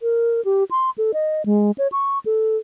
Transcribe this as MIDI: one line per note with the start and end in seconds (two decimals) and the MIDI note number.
0.01 0.43 70
0.45 0.64 67
0.71 0.90 84
0.98 1.12 69
1.14 1.42 75
1.46 1.71 56
1.78 1.88 73
1.92 2.19 85
2.26 2.57 69